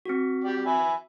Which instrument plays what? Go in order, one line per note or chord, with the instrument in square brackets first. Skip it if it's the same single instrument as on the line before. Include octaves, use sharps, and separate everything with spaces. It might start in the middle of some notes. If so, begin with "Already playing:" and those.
[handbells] C4 F#4
[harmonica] G4 D5
E5 G#5 B5